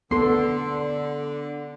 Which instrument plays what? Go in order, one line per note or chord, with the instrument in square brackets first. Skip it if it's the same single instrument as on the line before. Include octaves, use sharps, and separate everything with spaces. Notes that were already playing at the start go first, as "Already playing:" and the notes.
[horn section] D3 [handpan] B3 A4 [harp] C6